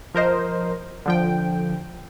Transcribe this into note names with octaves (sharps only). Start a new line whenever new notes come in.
F3 A#4 C5 D#5
D3 F3 G5